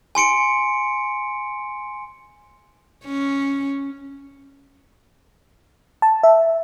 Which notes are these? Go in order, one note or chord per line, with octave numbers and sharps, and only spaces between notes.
G#5 C6 C#7 D7
C#4
A5
E5